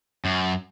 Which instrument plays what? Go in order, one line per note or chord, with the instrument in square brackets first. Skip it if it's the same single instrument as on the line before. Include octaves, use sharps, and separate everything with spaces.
[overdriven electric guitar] F#2